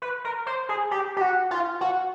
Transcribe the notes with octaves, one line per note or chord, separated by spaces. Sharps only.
B4
A#4
C5
G#4
G4
G4
F#4
F4
F#4